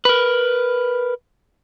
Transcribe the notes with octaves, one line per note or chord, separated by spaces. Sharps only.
A#4 B4